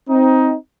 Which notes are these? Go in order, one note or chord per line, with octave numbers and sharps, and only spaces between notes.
C4 D#4